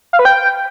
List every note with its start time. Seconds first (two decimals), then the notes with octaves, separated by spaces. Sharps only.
0.13 F5
0.19 B4
0.25 G5